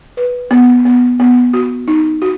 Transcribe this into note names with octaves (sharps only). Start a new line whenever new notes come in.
B4
B3
B3
B3
F#4
D#4
F#4